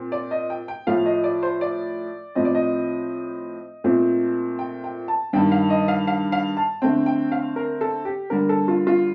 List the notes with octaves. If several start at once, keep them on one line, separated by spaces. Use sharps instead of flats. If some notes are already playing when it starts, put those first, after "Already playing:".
Already playing: A#2 C4
D5
D#5
G5
G5
A2 F3 A3 F5
D#5
D5
C5
D5
A2 F3 C4 D#5
D5
D#5
A#2 A3 C4
G5
G5
A5
G2 D#3 G3 G5
F5
D#5
F5
F5
F5
A5
D3 A3 C4 G5
G5
F5
A#4
A4
G4
D3 G3 A#3 A#4
A4
F4
F4